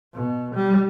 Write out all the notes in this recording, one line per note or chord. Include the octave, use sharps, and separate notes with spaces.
B2
G3